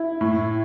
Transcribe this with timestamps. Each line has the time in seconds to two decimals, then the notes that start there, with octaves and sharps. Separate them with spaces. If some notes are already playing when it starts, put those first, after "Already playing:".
Already playing: E4
0.21 A2